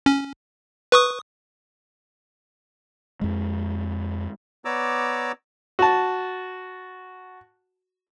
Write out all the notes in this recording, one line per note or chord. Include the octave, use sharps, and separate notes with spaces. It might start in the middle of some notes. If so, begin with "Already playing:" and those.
C#4
B4 C#6 D#6
F2 G#3
B3 C#5 D5 A#5 D6 E6
F#4 A5